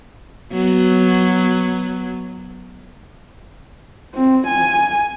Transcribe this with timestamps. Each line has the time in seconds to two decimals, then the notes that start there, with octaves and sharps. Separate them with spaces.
0.52 F#3 B3
4.15 C4
4.47 G#5